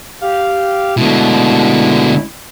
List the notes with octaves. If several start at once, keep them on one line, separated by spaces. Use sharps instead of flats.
G4 F5
B2 D3 G#3 A3 E4